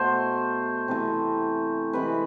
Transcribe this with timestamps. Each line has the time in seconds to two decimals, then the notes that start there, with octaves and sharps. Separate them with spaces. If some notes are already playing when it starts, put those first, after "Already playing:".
Already playing: B2 A3 C5
0.88 C3 E3 A3
1.93 C3 E3 G#3 B4